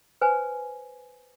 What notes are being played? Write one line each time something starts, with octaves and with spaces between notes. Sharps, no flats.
B4 C5 G#5